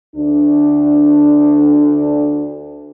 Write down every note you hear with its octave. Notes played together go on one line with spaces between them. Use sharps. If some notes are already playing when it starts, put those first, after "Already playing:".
D2 D4